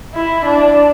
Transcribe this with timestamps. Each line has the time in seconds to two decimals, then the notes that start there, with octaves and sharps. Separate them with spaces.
0.14 E4
0.45 D4